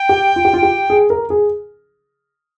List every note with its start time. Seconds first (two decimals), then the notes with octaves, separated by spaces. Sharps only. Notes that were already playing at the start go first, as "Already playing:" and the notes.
Already playing: G5
0.09 G4
0.36 F4
0.45 G4
0.54 F4
0.63 G4
0.90 G#4
1.10 A#4
1.30 G#4